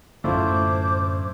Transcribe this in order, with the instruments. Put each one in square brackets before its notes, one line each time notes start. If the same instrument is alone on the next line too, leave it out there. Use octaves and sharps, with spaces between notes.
[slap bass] F#2 A2 D3 [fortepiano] A3 E4 F4 [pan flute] C5 [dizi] D6